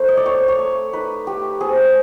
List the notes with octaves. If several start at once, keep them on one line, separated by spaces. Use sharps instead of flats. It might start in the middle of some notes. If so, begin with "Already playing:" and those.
Already playing: A3 D#4 C5
D#5
D5
C4 C#5
C#5
A3
D#4 B4
A3 G4
C4 G#4